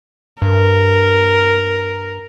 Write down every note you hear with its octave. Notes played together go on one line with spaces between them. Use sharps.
G2 A#4